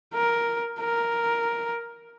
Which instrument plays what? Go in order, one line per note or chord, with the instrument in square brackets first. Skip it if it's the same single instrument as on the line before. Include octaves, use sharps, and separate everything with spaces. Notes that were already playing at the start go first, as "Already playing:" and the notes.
[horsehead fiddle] A#4
A#4